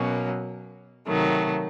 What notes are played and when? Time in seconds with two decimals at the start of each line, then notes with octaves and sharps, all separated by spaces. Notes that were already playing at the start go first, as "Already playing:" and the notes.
Already playing: B2 F#3 A#3 C#4
1.06 C3 D#3 F#3 A3